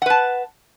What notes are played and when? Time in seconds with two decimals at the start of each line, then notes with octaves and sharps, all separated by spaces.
0.02 F#5
0.06 B4
0.10 A5